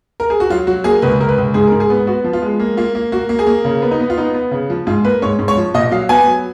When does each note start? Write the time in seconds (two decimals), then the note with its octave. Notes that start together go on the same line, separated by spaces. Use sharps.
0.20 A#4
0.30 G#4
0.40 F#4
0.50 F#3 F4
0.67 F#3 F#4
0.84 A#3 G#4
1.02 C#2 B4
1.20 C#2 A#4
1.29 B4
1.38 C#2
1.54 G#2 G#4
1.67 G#2 A#4
1.80 G#4
1.90 B3
2.07 B3 F#4
2.24 F3
2.33 F4
2.42 G#3
2.60 A#3
2.77 A#3 F4
2.95 A#3
3.12 A#3 F#4
3.29 A#3
3.39 G#4
3.47 A#3
3.65 C#3
3.82 B3
3.91 D#4
4.00 B3
4.10 F4
4.17 B3 D#4
4.34 B3
4.51 C#3
4.70 F3
4.87 G#2 F4
5.05 A#3 B4
5.22 G#2 C#5
5.39 G#2
5.48 C#5
5.57 F3
5.74 A#2 D#5
5.91 F#3 F5
6.09 B3 G#5
6.27 F#3